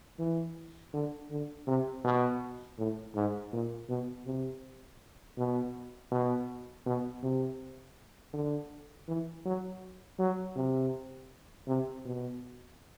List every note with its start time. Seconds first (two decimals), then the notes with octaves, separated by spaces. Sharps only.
0.19 E3
0.94 D3
1.31 D3
1.67 C3
2.04 B2
2.78 A2
3.16 G#2
3.53 A#2
3.89 B2
4.26 C3
5.38 B2
6.12 B2
6.86 B2
7.23 C3
8.34 D3
9.08 E3
9.45 F#3
10.19 F#3
10.56 C3
11.68 C3
12.05 B2